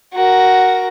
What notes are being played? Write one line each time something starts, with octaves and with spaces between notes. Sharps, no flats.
F#4 A#4